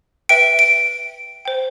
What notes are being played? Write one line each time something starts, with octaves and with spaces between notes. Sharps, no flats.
B4 E5 G5 D7
D7
C5 G5